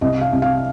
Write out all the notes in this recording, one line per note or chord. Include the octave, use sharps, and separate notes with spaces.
C2 D#5
F5
C2
F5